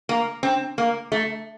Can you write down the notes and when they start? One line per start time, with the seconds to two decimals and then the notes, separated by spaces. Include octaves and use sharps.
0.09 A#3
0.43 C4
0.78 A#3
1.12 A3